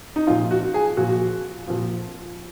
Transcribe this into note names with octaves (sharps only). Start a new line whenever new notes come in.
D#4
A#2 F3 F4
F#4
G#4
A#2 F3 F#4
A#2 F3